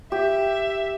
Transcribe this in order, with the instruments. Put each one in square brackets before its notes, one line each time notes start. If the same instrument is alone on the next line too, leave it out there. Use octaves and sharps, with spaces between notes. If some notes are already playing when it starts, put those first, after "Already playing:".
[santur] G4 [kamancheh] E5